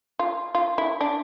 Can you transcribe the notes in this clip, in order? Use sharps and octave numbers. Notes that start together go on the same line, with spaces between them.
F4
F4
E4
D4